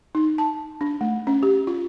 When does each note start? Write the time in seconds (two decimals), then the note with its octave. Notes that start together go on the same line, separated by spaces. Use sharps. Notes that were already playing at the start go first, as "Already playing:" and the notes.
0.15 D#4
0.38 A5
0.81 D4
1.01 A3
1.27 C#4
1.43 G4
1.67 F4